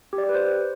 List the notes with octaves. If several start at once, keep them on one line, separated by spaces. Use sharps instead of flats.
G4
D5
G4
B4
C5